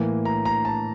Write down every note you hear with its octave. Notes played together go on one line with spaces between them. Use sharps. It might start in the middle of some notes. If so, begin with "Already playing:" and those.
Already playing: A2 E3 A#3
A#5
A#5
A5